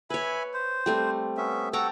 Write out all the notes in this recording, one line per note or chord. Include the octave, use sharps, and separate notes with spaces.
B4 C#5 E5 G#5 B5
C5
G3 A3 C4
B3 C#4 E5
F#4 A4 G5 A5 A#5